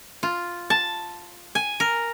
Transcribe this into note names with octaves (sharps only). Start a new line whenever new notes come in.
F4
A5
G#5
A#4